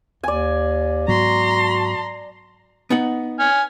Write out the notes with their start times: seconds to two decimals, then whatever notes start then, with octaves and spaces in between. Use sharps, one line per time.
0.23 D#2 D5 G#5
1.08 G#2 F#3 B3 F#4 A#5 C6
2.90 B3 D#4 F#5
3.40 G#5 F6